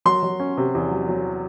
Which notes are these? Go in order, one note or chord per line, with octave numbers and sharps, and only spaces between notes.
F#3 C6
F#3
C#4
C3
E2
F#3
F#3